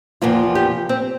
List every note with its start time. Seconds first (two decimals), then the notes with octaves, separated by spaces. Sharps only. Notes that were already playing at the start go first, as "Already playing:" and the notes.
0.22 E2 C3 F3 A#3 F4
0.55 G4
0.89 C4